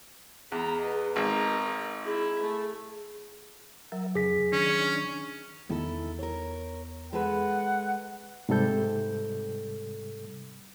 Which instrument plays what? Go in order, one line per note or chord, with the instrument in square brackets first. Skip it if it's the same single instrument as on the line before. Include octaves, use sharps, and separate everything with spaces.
[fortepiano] E2 [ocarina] G#4 [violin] A#5 B5
[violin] B3 D#5
[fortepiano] G#1 [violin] D#4 A#4
[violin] E4 [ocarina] G#4
[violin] A3
[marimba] F#3 [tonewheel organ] A#4 E5
[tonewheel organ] F2 C#3 [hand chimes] G#4 B6
[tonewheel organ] D#3 D4 [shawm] C#4
[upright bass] E2 B3 [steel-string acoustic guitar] D#3 E4 A4
[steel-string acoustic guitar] A#4 C#5
[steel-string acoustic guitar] G#3 A4 B4 [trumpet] F#5
[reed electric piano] G#2 C3 G3 A4 G6